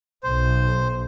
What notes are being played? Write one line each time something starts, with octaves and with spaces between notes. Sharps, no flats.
B1 C5